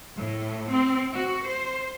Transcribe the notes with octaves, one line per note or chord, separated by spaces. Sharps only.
A2
C4
F#4
C5